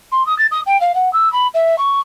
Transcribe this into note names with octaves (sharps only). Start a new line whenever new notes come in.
C6
D#6
A6
D#6
G5
F5
F#5
E6
B5
E5
C#6